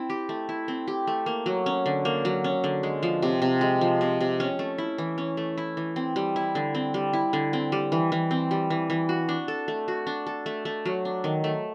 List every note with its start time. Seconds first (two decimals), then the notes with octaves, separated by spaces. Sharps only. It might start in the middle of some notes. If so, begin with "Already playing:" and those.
Already playing: C4 E4
0.10 G4
0.29 A3
0.49 E4
0.68 C4
0.88 G4
1.07 A3
1.26 A#3
1.46 F#3
1.66 C#4
1.86 D3
2.05 A#3
2.25 F#3
2.44 C#4
2.64 D3
2.83 G#3
3.03 F3
3.22 C3
3.42 C3
3.61 G#3
3.81 F3
4.01 C3
4.21 C3
4.40 C#4
4.59 A3
4.78 E4
4.98 E3
5.18 C#4
5.37 A3
5.58 E4
5.77 E3
5.96 C4
6.16 G3
6.36 E4
6.55 D3
6.75 C4
6.94 G3
7.13 E4
7.33 D3
7.53 C4
7.72 G3
7.92 E3
8.12 E3
8.31 C4
8.51 G3
8.70 E3
8.90 E3
9.09 F#4
9.29 D4
9.48 A4
9.68 A3
9.88 F#4
10.07 D4
10.27 A4
10.46 A3
10.65 A3
10.85 F#3
11.05 D4
11.24 D#3
11.44 A3